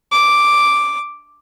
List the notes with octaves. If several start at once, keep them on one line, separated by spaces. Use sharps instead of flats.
D6